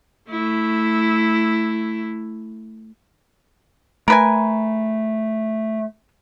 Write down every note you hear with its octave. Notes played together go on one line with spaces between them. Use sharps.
A3 E4
A3 A#4 B4 G#5